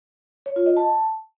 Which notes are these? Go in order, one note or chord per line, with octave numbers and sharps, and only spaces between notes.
C#5
F4
D#5
A5